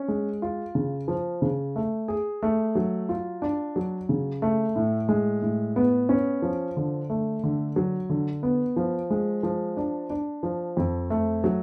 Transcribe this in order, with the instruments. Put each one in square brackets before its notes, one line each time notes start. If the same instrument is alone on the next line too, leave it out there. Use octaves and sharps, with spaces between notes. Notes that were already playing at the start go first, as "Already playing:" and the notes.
Already playing: [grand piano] C#4
G#3
F4
C#3
F3
C#3
A3
G#4
A3
F#3
F4
D4
F#3
C#3
A3
A2
G#3
A2
B3
C#4
F3
D3
A3
D3
F#3
D3
B3
F3
G#3
F3
D4
D4
F3
F2
A3
F#3